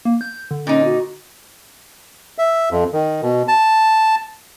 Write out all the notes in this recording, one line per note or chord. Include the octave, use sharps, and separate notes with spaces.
A#3
G6
D3
A#2 C#4 D#4
F#4
E5
F2
D#3
B2
A5